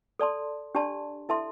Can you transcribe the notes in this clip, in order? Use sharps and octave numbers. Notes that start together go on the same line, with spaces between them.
A4 D5 A5 C6
D4 G4 D5 A5 C6
E4 A4 E5 A5 C6